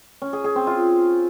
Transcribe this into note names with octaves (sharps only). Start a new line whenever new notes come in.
C#4
G#4
G#4
C4
F4